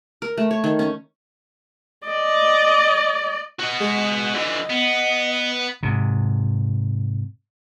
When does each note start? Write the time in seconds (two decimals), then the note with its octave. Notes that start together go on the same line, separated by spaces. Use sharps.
0.22 A#4
0.37 A3
0.51 C#5
0.64 D#3
0.79 C#4
2.07 D5 D#5
3.60 F#4 D#5
3.80 G#3
4.34 D3 E3 D#5
4.70 B3
5.83 G#2 C3